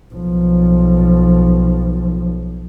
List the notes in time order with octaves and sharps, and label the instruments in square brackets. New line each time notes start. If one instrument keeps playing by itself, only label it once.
[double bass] B1 F3